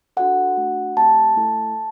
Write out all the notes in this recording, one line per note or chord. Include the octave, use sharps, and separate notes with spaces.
D4 F#4 A4 F#5
A3 D4 F#4
A3 C4 G4 A5
A3 E4 A4